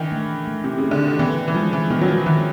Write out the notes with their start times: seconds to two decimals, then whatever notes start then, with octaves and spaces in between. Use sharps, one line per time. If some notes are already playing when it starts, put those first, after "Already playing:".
Already playing: D#3 E3 D4
0.12 A3
0.48 A3
0.64 C3
0.78 C#3
0.83 A3
0.91 D3
1.06 D#3
1.19 E3 B3
1.48 E3
1.55 F3 G#3
1.73 E3
1.90 D#3 B3
2.01 F#3
2.08 F3
2.26 D#3 E3